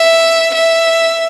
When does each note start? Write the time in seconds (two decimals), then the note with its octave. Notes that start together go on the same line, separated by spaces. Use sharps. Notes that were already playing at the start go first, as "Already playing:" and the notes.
Already playing: E5
0.55 E5